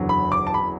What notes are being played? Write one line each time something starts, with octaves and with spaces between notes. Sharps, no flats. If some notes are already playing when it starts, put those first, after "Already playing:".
Already playing: F#1 E2 D3 F#3
B5
D6
A5
B5